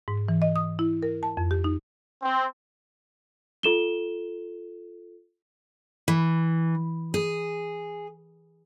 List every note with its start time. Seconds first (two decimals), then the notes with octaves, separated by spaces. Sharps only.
0.08 G#2
0.29 E3
0.42 D#5
0.56 D#6
0.79 E4
1.03 A#4
1.23 A5
1.37 F2
1.51 G4
1.64 D#4
2.22 C4
3.63 F4 A4 E7 G7
6.08 E3
7.14 G#4